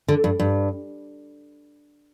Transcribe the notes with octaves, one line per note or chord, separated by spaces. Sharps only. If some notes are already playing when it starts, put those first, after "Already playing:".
D3
G2
G2